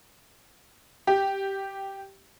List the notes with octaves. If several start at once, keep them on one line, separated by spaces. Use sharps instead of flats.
G4